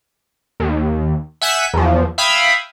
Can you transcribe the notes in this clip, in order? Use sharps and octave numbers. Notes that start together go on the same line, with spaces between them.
D#2
E5 F#5 G#5 G6 B6 E7
E2 F3
E5 F5 G5 B5 D#6 G#6